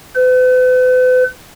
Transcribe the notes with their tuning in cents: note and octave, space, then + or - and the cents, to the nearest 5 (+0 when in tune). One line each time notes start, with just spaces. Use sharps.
B4 +45